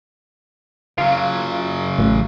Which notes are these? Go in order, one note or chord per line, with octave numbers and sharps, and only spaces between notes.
C#3 F#3 F4
A1